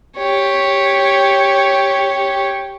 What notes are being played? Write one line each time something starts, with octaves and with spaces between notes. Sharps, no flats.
G4 C#5